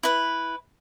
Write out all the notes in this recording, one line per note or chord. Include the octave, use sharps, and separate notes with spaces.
E4 B4